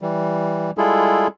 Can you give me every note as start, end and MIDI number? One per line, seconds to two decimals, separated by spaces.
0.02 0.71 52
0.02 0.71 55
0.78 1.27 55
0.78 1.27 56
0.78 1.27 64
0.78 1.27 65
0.78 1.27 68
0.78 1.27 69